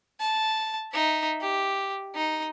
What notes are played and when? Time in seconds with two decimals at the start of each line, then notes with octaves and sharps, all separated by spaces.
0.20 A5
0.93 D#4 E5
1.41 G4
2.15 D#4